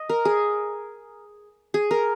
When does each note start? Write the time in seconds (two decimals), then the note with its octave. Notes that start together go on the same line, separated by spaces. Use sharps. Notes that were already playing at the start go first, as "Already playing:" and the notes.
Already playing: D#5
0.09 A#4
0.25 G#4
1.74 G#4
1.91 A#4